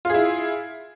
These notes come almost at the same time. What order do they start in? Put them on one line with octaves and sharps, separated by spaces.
F4 G#4 E4